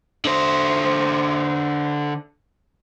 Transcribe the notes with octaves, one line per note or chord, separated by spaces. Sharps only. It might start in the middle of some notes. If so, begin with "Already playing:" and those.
D3 C5